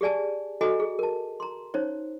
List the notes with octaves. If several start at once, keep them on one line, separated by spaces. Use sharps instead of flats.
G4 G#4 D5 G#5 A5
F#4 A4 D#5 G#5 A#5
G#4
A#4 A5
A#5 C6
C#4 D#4 C5 C#5